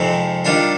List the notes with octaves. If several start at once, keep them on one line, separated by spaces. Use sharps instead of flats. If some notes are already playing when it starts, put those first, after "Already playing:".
Already playing: F2 C3 D#3 G#3 C4
D#3 G3 D4 F4